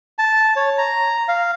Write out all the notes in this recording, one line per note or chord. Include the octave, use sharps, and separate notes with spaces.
A5
C#5
A#5
F5